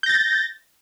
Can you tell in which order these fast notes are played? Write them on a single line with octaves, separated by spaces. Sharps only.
G6 A#6 A6